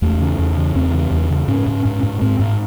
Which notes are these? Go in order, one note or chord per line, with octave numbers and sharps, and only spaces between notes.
E2 A3
C#3
E2
C#3
E2 C4
C#3
E2
C#3
G#2 C#4
G#2
G#2
G#2
G#2 C4
G#2